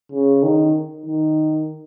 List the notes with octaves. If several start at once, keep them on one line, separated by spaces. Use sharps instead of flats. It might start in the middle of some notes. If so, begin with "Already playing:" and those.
C#3
D#3
D#3